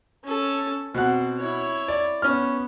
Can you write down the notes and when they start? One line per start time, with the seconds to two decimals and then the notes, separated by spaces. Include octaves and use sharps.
0.24 C#4 A4
0.94 B2 C4 F#5
1.40 E4 C#5
1.88 D5
2.22 B3 C#4 F6